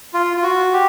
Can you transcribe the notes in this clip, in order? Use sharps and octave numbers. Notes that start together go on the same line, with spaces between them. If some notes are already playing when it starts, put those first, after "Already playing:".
F4
F4
F#4
G4